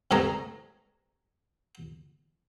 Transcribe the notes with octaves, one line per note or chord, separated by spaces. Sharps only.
G2 C3 A3 G#4 A#5